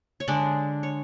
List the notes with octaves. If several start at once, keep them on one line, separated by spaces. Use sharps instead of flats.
C#5
D3 G#3 D4 D5
C#5